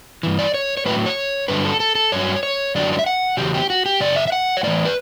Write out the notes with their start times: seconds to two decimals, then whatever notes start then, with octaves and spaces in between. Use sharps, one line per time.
0.23 G2 E3
0.39 D5
0.54 C#5
0.77 C#5
0.86 A2 F#3 B4
1.06 C#5
1.48 G2 D3 F#3 B4
1.65 A4
1.80 A4
1.95 A4
2.12 G2 F#3 C#5
2.43 C#5
2.75 F#2 D3 F#3 D5
2.93 D5
2.99 E5
3.06 F#5
3.37 E2 C#3 F#3 G4
3.54 G4
3.70 F#4
3.86 G4
4.00 F#2 C#3 D5
4.16 E5
4.28 E5
4.32 F#5
4.57 C#5
4.63 A2 E3 D5
4.85 B4